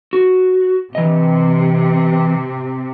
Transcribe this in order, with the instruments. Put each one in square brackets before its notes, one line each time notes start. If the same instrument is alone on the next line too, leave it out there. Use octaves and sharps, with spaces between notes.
[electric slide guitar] F#4
[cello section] C3 [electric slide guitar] E3 D#5